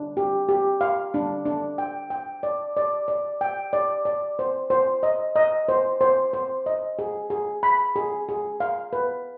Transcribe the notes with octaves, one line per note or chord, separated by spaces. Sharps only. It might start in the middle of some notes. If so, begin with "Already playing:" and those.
Already playing: D4
G4
G4
F5
D4
D4
G5
G5
D5
D5
D5
G5
D5
D5
C5
C5
D#5
D#5
C5
C5
C5
D#5
G#4
G#4
B5
G#4
G#4
F5
B4